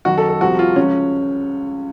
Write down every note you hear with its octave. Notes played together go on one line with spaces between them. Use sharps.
F#2 D#3 F#4
A4
A4
C2 C3 F3 F#4
F4
C#2 C#3 F3 C#4